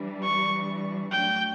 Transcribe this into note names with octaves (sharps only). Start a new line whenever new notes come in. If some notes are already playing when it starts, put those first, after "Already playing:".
Already playing: E3 G3 D4
C#6
A2 F#3 A3 D4 F#4 G5